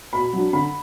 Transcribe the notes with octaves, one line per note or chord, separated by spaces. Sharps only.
B2 B5
F#3 D4
D3 B5